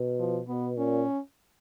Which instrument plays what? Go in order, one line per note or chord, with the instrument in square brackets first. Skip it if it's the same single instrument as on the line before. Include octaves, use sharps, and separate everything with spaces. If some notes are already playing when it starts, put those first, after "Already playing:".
Already playing: [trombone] B2
[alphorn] F3
[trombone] B2 [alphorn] B3
[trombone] A#2 [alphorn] C#4